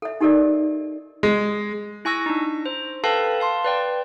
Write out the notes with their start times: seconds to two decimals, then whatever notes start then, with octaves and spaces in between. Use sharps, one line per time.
0.02 A4 E5
0.21 D#4 G4 A4 A#4 D5 D#5
1.23 G#3
2.05 E4 G#5 C#6 E6 A#6
2.26 D4 D#4
2.66 C5
3.04 A4 B4 F5 G5 A5 B5
3.40 F5 A5 C6
3.65 B4 D5 G5